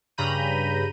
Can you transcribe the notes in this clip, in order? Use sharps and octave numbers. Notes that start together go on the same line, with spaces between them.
G2 C#3 A#5 B5 G6 D#7